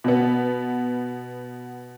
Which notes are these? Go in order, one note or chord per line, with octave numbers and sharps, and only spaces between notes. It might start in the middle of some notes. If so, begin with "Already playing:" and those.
B2 B3